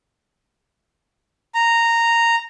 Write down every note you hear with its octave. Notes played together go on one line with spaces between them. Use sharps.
A#5